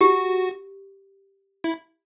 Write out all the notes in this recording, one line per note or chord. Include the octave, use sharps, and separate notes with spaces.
F#4 G4
E4